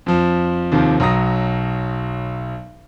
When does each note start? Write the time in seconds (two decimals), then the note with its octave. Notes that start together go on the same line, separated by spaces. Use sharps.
0.06 F2 F3
0.72 D#2 C3 D#3 F3
1.00 B1 F#3 A#5 D#6 A#6